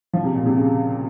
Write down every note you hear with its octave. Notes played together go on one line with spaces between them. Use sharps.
F3
C3
A#2
C3
C#3